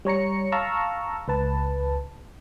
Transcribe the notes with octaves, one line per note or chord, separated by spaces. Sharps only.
G3 C#5 A#5 C#7
F5 A5 A#5 C#6 E6
C#2 B4 A5